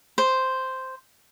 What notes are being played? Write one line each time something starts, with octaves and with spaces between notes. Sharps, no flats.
C5